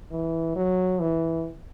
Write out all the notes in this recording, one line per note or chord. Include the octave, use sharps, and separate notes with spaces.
E3
F#3
E3